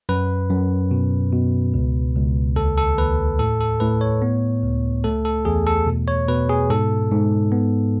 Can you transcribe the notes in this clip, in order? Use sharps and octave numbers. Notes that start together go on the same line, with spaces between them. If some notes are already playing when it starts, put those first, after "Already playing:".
F#2 B4
F#2
B2
B2
C#2
C#2
D#2 A4
A4
D#2 B4
A2 A4
A4
A2 B4
C#5
B3
C#2
A3 A4
A4
E2 G#4
A4
B2
C#5
B2 B4
G#4
G#2 A4
G#2
B3